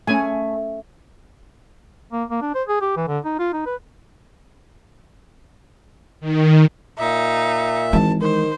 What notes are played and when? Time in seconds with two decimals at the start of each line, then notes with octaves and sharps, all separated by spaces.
0.07 A3 C#4 G#5
2.12 A#3
2.30 A#3
2.41 D4
2.55 C5
2.68 G#4
2.81 G4
2.96 E3
3.08 D3
3.25 D#4
3.39 F4
3.53 D#4
3.66 B4
6.20 D#3
6.98 A#2 D#4 E5
7.93 G#1 E3 G#3 A5
8.21 D#3 C5